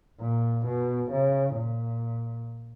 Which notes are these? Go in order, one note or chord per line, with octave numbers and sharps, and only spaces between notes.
A#2
B2
C#3
A#2